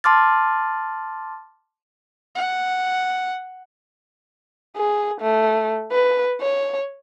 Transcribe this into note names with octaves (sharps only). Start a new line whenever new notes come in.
A5 C6 D6 F6 A6
F#5
G#4
A3
B4
C#5